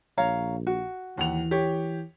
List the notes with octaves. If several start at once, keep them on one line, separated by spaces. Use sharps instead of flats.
A#1 C#5 F5 A#5
F#4
D#2 E3 F#5 F7
G4 C#5